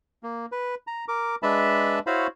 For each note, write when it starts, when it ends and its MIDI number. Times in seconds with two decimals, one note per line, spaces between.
0.23 0.46 58
0.52 0.75 71
0.87 1.05 82
1.08 1.35 70
1.08 1.35 86
1.43 1.99 56
1.43 1.99 62
1.43 1.99 71
1.43 1.99 76
1.43 1.99 81
1.43 1.99 83
2.07 2.27 64
2.07 2.27 66
2.07 2.27 72
2.07 2.27 73
2.07 2.27 77
2.07 2.27 83